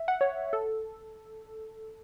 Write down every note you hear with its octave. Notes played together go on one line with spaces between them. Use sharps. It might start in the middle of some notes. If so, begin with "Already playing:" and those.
Already playing: E5
F#5
C#5
A4